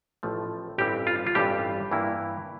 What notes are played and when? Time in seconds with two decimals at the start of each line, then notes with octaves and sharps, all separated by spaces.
0.23 A1 A2 F3 A3
0.78 A1 G2 E3 G3 C4 G4
1.07 F4
1.27 F4
1.35 A1 G2 E3 G3 C4 G4
1.91 G2 E3 A#3 E4